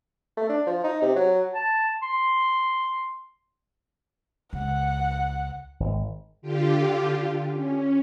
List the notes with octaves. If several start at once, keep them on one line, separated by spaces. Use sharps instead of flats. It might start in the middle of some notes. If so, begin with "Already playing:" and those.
A3
D4
F3
D#4
C3
F#3
A5
C6
C#2 F#5
G#1
D3 F4 G4
C#4